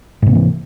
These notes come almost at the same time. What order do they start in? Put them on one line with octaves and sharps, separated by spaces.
G#2 C3 A#3 E3